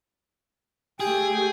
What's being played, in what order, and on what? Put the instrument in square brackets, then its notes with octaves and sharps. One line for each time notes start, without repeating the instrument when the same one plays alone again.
[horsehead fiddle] A3 G5 [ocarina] G4 [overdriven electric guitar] G#4